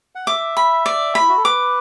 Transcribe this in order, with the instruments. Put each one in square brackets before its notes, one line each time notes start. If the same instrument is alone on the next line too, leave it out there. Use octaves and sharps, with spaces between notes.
[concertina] F#5
[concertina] E5 [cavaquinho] D6
[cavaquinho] B5
D5
B5
[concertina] E4
F#4
A4
[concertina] B4 [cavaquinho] D6